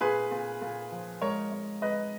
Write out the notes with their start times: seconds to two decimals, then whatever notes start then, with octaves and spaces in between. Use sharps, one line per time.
0.01 A#2 G#4 B4
0.31 A#2
0.61 A#2
0.91 F3
1.21 G#3 A#4 C#5
1.52 G#3
1.82 G#3 B4 D#5